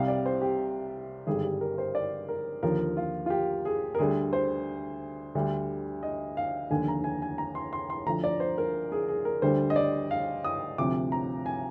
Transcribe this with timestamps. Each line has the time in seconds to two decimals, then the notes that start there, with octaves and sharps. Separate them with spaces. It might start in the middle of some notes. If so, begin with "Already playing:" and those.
Already playing: C2 C3 G3 F5
0.08 D5
0.26 C5
0.41 G4
1.27 G#1 G2 D3 G3 G#4
1.44 G4
1.61 A#4
1.78 C5
1.95 D5
2.29 A#4
2.63 D#2 D3 F3 A#4
2.97 F4
3.26 F4
3.30 G4
3.65 G#4
3.95 A#4
3.98 D2 D3 G3 G#4
4.33 C5
5.35 D2 D3 G3
6.03 D#5
6.37 F5
6.70 F1 D#2 D3 G#5
6.88 A#5
7.04 G#5
7.22 G#5
7.38 A#5
7.55 C6
7.73 C6
7.90 C6
8.06 D2 D3 F3 A#5
8.24 D5
8.40 C5
8.58 A#4
8.92 G#4
9.08 G#4
9.25 A#4
9.42 D2 D3 G3 C5
9.70 D#5
9.76 D5
10.11 F5
10.44 D#6
10.78 D2 C3 F3 D6
11.12 A#5
11.46 G#5